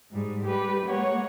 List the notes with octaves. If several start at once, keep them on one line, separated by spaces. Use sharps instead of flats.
G#2 G3 G#3
G3 G4 B4
G#3 A#3 C#5 F#5